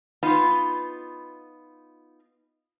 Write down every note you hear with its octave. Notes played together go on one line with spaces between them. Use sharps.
B3 D#4 F4